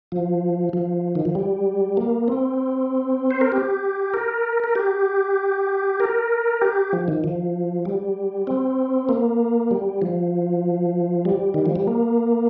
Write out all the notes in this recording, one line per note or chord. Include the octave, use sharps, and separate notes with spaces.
F3
F3
D#3
F3
G3
A#3
C4
C5
A#4
G4
A#4
A#4
G4
A#4
G4
F3
D#3
F3
G3
C4
A#3
G3
F3
G3
D#3
F3
G3
A#3